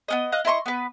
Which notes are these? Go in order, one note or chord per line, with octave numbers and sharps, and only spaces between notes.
B3 C#4 D#5
D#5 F5 F#6
E4 D#5 C6 C#6
B3 B4